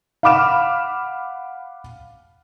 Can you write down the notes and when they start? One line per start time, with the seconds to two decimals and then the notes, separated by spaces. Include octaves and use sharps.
0.23 F5 F#5 B5 D6 F6 E7